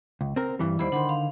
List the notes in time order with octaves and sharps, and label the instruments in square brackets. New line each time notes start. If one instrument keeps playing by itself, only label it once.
[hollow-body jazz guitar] C#2
C4 A#4
G2 E3 G3
[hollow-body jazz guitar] D#2 G3 E4 [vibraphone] C5 B5
[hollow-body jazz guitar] D3 D#3 [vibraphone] F#5 B5 C6
[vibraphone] F5